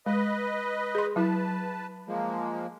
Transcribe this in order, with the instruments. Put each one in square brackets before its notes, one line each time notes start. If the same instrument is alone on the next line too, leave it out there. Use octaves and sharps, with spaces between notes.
[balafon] G#3 [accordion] B4 D#5
[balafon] G#4 C6
[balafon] F#3 E4 [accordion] B4 A5
[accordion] F3 G#3 A#3